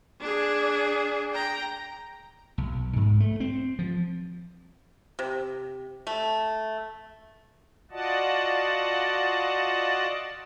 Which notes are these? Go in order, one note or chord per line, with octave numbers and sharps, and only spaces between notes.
D4 G#4
G5 A#5
B1
G#2
A3
C4
F3
C3
A3
F4 F#4 D5 D#5 F#5 A5